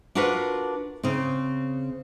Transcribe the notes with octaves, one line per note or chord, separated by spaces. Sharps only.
D4 F4 F#4 A#4 B4
C#3 C4